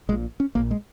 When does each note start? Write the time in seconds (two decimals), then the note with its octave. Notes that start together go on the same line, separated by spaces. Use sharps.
0.09 A#1 G#3
0.12 A#2
0.40 C#4
0.55 A#1 A#2 A#3
0.71 G#3